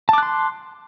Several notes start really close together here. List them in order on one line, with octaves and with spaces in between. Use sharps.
A5 D6 F#6 C6